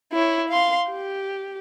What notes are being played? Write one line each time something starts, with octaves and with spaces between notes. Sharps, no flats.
E4 C#5
F5 C6
G4